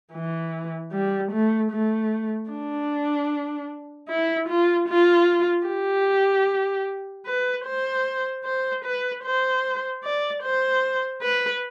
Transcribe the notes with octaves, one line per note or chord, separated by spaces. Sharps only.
E3
G3
A3
A3
D4
E4
F4
F4
G4
B4
C5
C5
B4
C5
D5
C5
B4